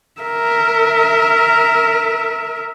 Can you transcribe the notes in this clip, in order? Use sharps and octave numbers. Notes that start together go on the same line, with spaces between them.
A#4 E5